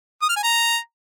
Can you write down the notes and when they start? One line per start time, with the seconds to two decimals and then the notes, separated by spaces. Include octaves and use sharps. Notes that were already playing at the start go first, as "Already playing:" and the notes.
0.22 D#6
0.29 F6
0.36 G#5
0.43 A#5